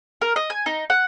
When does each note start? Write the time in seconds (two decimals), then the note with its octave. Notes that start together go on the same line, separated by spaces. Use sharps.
0.21 A#4
0.36 D#5
0.50 G#5
0.66 D#4
0.90 F#5